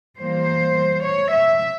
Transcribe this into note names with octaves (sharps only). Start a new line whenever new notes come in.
E3 G3 A#3 C5
C#5
E5